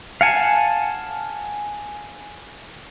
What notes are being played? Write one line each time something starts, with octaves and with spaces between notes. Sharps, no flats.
F5 F#5 G#5 A5